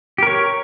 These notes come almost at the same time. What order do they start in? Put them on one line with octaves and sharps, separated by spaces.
G4 A#4 C#5